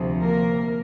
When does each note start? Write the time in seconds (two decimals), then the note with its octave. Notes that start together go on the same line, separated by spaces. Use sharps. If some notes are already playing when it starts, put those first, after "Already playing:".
Already playing: D2 C3 F3
0.22 A#3 A#4